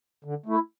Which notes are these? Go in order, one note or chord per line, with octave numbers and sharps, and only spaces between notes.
D3
A3 E4